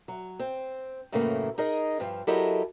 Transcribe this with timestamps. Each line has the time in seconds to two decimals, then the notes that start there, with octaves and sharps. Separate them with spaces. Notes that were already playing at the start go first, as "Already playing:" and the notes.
0.08 F#3
0.39 C4
1.12 F#2 A2 C#3 E3 A3 A#3
1.58 D#4 G#4 A#4 D#5
2.00 G2 F3
2.27 F#3 E4 G4 A4 A#4 D#5